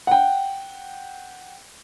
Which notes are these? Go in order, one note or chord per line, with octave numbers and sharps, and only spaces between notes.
F#5 G5